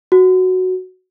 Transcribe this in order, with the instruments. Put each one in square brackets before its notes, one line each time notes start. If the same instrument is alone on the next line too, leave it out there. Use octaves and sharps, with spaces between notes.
[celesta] F#4